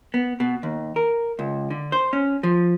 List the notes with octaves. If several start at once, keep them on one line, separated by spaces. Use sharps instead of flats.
B3
B2
D#2
A#4
C#2
D3
C5
C#4
F3